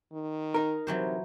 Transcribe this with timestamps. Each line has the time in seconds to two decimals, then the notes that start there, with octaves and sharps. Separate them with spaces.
0.12 D#3
0.54 D#4 A#4
0.87 C3 E3 F#3 C5